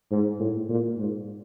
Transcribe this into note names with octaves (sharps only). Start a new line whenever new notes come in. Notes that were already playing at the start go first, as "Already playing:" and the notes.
G#2
A2
A#2
G#2